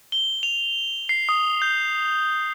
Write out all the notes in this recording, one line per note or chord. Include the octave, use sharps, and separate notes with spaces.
G7
F7
C7
D#6
G6